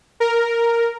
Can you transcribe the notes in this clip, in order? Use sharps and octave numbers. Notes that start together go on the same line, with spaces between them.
A#4